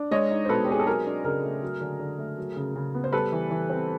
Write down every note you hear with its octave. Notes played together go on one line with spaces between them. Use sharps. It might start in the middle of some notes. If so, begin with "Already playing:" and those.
Already playing: D4
G#3 C#5 D#5
D#4
C5
B2 A4 B4
G4
C4 G#4
A4
F#3 G#4 A#4
D4
C#3 G#4 A#4
A3
F#3
D3
D3
A3
F#3
C#3
C#3
B3
C5
G3 A4 B4
E3
E3
C4